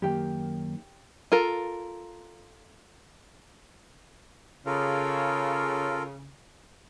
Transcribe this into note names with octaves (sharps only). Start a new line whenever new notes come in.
F#2 D#3 A#3 G4 G5
F4 A4 A#4
C#3 F4 A4 A#4